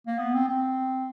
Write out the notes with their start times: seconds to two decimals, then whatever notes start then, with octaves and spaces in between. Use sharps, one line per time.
0.07 A#3
0.19 B3
0.34 C4
0.48 C4